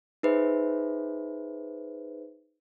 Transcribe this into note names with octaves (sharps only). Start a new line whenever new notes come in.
D#4 G#4 B4 C5 E5